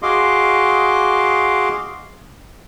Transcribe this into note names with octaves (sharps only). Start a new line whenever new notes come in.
F#4 G#4 D#5 F5 C6 D6